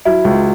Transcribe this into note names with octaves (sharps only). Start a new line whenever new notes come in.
F#3 E4
C#2